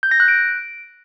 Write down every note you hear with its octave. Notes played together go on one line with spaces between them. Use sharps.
G6
A#6
F#6
D7